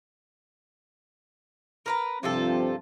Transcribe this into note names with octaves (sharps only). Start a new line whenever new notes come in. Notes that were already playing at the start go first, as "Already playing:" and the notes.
A#4 B4 A#5
G2 C3 F3 C4 F4 A4